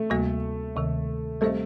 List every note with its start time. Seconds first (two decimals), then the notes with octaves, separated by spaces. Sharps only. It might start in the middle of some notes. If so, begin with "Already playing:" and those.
Already playing: A3
0.10 D2 C3 G3 A#3 F#4
0.76 D2 C3 D#3
1.41 G3 A3 C4 G4 C5 D#5